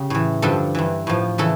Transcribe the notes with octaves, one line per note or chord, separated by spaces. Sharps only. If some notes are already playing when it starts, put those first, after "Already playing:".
Already playing: C#3 G4
A2 E3
G2 D3 F3 A4
G2 E3
A2 F3
C#3 E3 A4